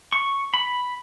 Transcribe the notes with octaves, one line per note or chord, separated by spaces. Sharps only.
C#6
B5